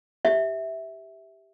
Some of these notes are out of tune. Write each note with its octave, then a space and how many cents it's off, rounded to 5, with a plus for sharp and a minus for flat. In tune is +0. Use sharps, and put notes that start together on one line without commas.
G4 +0 E5 -10